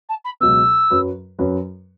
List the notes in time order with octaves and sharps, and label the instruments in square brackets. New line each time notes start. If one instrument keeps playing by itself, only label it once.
[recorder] A5
B5
[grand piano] C#2 B2 F#3 B3 [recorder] E6
[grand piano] F#2 F#3 C#4 F#4 B4
F#2 F#3 C#4 F#4 B4